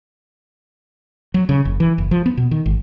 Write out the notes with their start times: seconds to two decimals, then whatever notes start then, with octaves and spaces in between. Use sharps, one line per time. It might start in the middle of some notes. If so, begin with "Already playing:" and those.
1.34 F#3
1.49 C#3
1.65 F#1
1.80 E3
1.98 F#1
2.11 F3
2.26 B3
2.37 B2
2.51 D#3
2.66 G#1